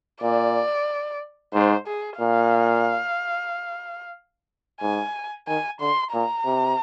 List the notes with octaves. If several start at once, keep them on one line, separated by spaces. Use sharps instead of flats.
A#2 D5
G#2 C5
G#4
A#2 F5
G#2 G#5
D#3 G#5
D3 C6
A#2 A#5
C3